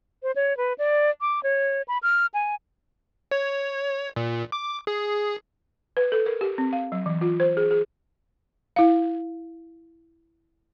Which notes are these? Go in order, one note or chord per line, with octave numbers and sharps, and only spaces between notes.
C5
C#5
B4
D5
D6
C#5
B5
F6
G#5
C#5
A#2
D6
G#4
B4
A4
A#4
G4
C4
F5
F#3
E3
F4
C5
G#4
G#4
E4 F5